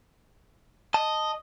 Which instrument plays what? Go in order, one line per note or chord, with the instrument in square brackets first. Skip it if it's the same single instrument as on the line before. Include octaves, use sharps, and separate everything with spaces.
[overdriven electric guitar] D#5 [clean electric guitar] A5